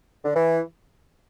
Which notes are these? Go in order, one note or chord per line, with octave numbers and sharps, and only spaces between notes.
D3
E3